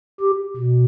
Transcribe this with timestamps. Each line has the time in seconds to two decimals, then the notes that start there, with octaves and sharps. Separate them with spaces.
0.21 G4
0.56 B2